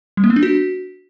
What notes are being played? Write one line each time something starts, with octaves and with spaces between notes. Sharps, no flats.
G3
A#3
B3
D4
F#4